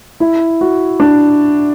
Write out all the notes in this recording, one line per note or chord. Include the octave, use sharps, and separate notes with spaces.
E4
F#4
D4